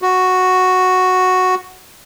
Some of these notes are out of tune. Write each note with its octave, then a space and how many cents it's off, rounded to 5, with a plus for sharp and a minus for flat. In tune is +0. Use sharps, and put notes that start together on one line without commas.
F#4 +0